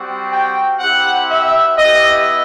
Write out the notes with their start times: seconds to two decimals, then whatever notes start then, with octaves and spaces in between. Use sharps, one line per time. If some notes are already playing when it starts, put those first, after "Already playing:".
Already playing: G3 C4 F#4
0.31 G5
0.80 C4 E4 G4 F#5
1.29 E5
1.77 B3 E4 G4 D#5